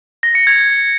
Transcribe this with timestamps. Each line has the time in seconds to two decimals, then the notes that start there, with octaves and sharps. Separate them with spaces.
0.23 A#6
0.35 C#7
0.47 G#6